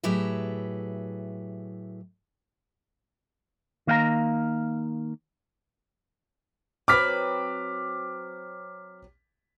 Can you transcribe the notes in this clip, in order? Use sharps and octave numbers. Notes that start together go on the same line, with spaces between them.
A2 F#3 G4 G#4 B4 E5
D#3 A#3 F5 F#5 A#5
F#3 C4 B4 D6 F6 B6